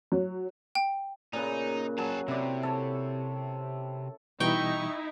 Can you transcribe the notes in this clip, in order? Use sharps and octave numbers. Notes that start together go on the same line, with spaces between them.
F#3
G5
A#2 C#3 D#4 B4
F#3 G#4 B4 A5
C3 E4 D5
A4 C#5
B2 E3 G3 D#4 E4 G5 C#6